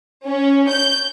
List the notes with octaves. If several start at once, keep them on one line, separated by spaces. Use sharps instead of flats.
C#4
G6